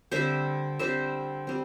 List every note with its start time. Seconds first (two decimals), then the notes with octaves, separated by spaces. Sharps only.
0.11 D3 G3 C4 C5 E5
0.79 D3 G3 C4 C5 E5
1.47 G3 C4